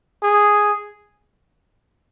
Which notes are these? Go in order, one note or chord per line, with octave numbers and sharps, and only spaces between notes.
G#4